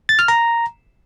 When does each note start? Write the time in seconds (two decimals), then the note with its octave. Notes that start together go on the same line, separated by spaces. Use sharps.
0.09 A6
0.19 F6
0.28 A#5